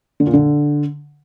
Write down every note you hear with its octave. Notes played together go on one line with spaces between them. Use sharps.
D3
A#2
D3